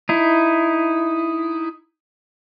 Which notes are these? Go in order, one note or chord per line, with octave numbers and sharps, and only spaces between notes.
D#4 E4